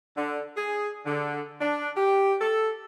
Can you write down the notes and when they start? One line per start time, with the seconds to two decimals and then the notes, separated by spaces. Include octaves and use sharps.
0.17 D3
0.56 G#4
1.06 D3
1.61 D4
1.97 G4
2.41 A4